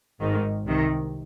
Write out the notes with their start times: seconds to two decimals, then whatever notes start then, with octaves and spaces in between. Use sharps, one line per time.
0.20 G#1 G#2 D#3
0.64 C2 C3 D#3